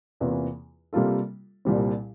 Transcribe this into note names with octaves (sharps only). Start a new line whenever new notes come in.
E2 C3 E3 A#3 F4
C3 G3 A#3 F4 A4
C2 A#2 G3 C4